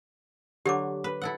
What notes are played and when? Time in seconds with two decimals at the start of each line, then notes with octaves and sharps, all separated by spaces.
0.66 D3 F#3 G4 D6
1.04 B4
1.22 E4 A4 F#5